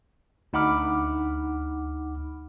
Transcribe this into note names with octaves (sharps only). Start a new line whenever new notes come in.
D2 D#4 F#5 B5 D6 F6